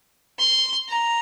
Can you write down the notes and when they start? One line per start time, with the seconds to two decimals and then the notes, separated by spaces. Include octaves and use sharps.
0.39 C6
0.89 A#5